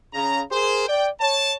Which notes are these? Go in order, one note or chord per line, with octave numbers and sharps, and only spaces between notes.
C#3 A#5
G#4 A#4 C5
D5 G5
C#5 A5